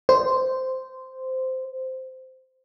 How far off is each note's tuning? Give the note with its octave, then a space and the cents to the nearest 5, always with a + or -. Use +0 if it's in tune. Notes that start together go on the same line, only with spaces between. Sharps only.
C5 -10